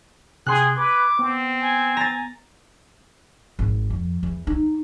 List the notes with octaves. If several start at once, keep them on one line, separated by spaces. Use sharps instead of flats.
C3 G#4 G5 C6 F#6
B4 D6 G#6
B3 C4
G#5
A#5 A6
G#1
F2
E2
D#4